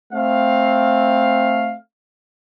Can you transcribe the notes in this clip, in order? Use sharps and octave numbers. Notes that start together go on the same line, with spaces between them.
A3 C4 F5